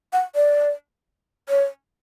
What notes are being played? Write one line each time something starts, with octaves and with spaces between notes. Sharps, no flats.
F#5
D5
C#5